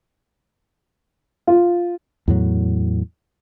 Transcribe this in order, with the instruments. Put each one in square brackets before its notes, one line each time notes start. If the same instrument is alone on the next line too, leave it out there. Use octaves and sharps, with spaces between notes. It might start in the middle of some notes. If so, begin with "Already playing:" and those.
[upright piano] F4
[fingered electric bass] E2 A2 F#3